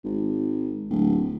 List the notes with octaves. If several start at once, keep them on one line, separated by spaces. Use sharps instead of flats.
G#1
D1